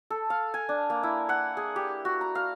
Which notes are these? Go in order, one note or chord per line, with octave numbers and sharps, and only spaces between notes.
A4
F5
G#5
D4
A#3
E4
F#5
G#4
G4
F#4
A#5
F5